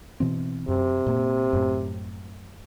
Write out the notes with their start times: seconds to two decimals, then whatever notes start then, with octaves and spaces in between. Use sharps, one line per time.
0.20 B2 E3 C4
0.68 F#2 C3
1.06 A#2 A#3
1.53 F#2 A2